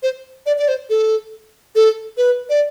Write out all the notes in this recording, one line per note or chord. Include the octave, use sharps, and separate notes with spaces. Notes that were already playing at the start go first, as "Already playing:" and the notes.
C5
D5
D5
C5
A4
A4
B4
D5